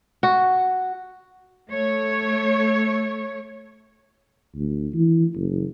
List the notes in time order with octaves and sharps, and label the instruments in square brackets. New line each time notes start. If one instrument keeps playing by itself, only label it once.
[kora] F#4
[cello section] A3 C#5
[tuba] D2
E3
F#1